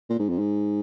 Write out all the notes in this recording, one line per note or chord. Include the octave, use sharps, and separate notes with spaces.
A#2
G#2
F2
G#2